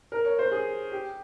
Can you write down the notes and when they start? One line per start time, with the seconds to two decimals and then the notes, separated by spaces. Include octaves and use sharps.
0.12 A#4
0.25 C#5
0.39 C5
0.51 G#4
0.92 G4